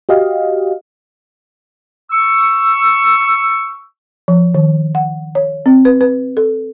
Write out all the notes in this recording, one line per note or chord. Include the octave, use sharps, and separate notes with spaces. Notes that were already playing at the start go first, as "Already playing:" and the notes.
F#4 G4 D#5 F5
C#6 E6
F3
D#3
F#5
C#5
C4
B4
B4
A4